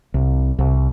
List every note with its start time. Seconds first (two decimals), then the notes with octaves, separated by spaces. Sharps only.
0.14 C2
0.59 C2